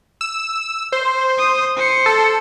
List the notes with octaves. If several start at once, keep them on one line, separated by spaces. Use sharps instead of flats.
E6
C5
D#6
C5 C#7
A4